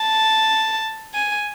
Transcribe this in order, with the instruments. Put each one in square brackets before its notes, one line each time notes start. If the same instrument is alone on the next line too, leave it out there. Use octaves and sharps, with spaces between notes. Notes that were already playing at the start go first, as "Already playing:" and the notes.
Already playing: [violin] A5
G#5